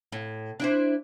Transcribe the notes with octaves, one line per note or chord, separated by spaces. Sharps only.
A2
D4 E4 C5